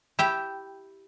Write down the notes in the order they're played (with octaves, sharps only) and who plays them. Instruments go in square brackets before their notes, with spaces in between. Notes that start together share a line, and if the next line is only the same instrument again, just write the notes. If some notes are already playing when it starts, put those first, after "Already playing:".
[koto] E4 G4 G5